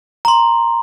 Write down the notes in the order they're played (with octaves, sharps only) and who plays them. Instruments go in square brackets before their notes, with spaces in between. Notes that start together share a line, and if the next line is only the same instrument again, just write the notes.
[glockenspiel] A#5 C6